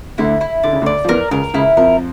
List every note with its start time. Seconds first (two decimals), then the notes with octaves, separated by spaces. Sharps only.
0.18 D2 D3 E4
0.41 E4
0.63 D3 D5
0.73 C#3
0.82 D2 D3
0.86 D5
1.05 F3
1.09 E2 E3 A#4
1.31 C#2 C#3 A#4
1.54 C#2 C#3 E4
1.77 F2 F3 A#4